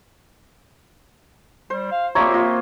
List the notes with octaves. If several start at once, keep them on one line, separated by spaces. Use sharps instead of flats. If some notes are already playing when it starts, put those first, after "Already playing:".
G3 C5
F5
F3 G3 A#3 C4 C#5 E5 A#5
F4 D#5 E6